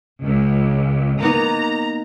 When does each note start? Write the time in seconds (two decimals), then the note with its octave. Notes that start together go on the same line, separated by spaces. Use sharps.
0.23 C#2
1.21 A#3 B3 D#4 A#5